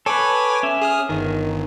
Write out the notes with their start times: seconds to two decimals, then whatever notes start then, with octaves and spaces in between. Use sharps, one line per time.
0.06 A4 B4 C#5 G#5 D6
0.63 C#4 E5
0.81 G#4 D#6 F6
1.09 G1 D#3